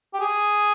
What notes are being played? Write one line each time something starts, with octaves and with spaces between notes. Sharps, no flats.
G4
G#4